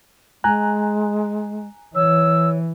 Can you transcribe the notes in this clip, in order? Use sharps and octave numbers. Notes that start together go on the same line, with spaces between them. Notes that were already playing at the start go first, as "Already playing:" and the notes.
G#3 G#5 A#5 F#6
E3 C#5 E6